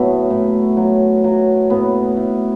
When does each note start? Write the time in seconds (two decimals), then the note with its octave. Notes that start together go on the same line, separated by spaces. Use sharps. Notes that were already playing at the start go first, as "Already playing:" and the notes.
Already playing: A2 F#3 A3 B3
0.30 A2
0.77 F#3
1.24 F#3
1.70 A2 B3
2.17 A2